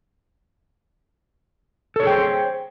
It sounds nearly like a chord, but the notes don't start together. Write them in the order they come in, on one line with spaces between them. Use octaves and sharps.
A4 C#5 G#4 G5 C5